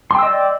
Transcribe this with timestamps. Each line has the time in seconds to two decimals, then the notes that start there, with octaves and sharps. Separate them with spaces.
0.11 C6
0.15 G5
0.19 E6
0.23 D#5
0.27 D5